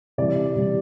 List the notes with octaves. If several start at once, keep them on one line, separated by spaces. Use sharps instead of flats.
C3 E3 G3 D5
C3 E3 G3